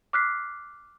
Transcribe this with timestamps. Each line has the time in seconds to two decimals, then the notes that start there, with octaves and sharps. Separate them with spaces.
0.13 D6 F6 F#6 B6 C7